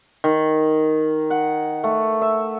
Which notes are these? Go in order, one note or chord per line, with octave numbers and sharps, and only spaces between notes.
D#3
F#5
A3
E5